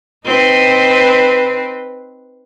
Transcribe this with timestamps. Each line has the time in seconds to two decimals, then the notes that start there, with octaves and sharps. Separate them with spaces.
0.25 C4 D#4 B4